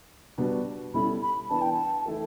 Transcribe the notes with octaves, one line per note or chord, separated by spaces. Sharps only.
B2 G3 D4 F#4 B4
B2 G3 C#4 E4 A4 B5
B5
E3 B3 D4 A5
G5
A5
E3 A3 E4